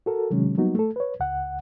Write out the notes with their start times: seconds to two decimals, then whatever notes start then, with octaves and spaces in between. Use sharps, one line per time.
0.06 F#4 A4 A#4
0.30 C3 D#3 F#3 G#3 C#4
0.57 F#3 G3 A#3 B3 D#4 F#4
0.75 A3 A4
0.96 B4 C#5
1.20 C#2 F#5